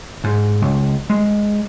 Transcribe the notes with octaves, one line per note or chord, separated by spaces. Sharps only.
G#2
C#2
G#3